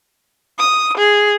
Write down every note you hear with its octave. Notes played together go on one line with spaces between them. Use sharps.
D#6
G#4